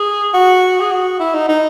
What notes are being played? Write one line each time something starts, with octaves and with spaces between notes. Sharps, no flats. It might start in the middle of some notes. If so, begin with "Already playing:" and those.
Already playing: G#4
F#4
G#4
F#4
E4
D#4
D#4